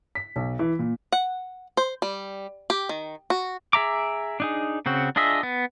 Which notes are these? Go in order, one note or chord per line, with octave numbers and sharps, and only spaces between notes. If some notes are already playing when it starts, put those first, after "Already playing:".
B6
B1
E3
A#2
F#5
C5
G3
G4
D#3
F#4
G#4 E5 A#5 D6
D4 D#4 G#4
C#3 C4 F#4
D4 F4 G#4 D#5 E5
B3